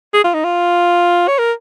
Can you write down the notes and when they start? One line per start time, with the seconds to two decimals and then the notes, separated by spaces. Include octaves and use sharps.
0.14 G#4
0.24 F4
0.34 D#4
0.44 F4
1.28 C#5
1.39 A#4